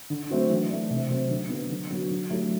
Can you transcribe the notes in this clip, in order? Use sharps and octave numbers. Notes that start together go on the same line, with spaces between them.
D3
F#3 A3 C4 F#4
E3
A3 D4
C3
F#3 C4
D3
F#3 B3
D3
F#3 B3 F#4
D3
F#3 A3 E4 G4